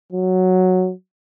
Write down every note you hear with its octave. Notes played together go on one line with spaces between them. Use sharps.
F#3